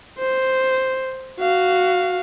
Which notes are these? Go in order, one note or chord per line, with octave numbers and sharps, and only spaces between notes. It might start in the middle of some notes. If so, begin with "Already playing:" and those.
C5
F#4 F5